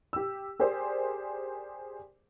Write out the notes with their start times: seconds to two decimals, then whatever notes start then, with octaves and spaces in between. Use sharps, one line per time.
0.13 G4 E6
0.60 G4 G#4 A#4 C5 D5